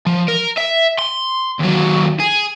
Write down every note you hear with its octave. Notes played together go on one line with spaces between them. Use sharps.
F3
A#4
E5
C6
D#2 F#3
G#4